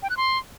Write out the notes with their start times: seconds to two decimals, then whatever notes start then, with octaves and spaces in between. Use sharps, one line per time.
0.03 G5
0.10 F#6
0.17 C6